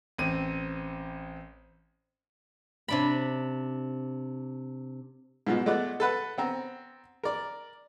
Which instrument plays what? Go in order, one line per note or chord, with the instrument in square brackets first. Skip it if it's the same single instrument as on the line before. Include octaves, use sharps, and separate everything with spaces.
[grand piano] A1 C4 D#7
[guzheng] C3 D4 B5
[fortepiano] G#2 B2 F4
G#3 A3 B3 D5 F#5
A4 B4 F#5
B3 C4 A#5
A#4 D5